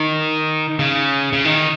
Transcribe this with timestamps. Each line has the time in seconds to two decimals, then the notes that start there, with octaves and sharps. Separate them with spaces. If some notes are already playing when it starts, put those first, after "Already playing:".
Already playing: D#3
0.79 C#3
1.33 C#3
1.45 D#3